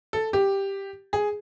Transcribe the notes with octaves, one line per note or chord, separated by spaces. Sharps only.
A4
G4
G#4